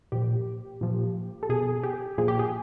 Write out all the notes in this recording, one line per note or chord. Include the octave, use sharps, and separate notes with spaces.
A#2 F3 G4
A#2 F3
A4
B2 G#4
G4
A#2 F3 G#4
G4
G#4